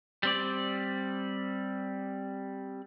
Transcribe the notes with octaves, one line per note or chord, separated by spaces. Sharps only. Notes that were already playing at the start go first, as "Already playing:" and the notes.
G3 C4 D5